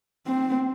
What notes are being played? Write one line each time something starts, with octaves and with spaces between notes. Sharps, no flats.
C4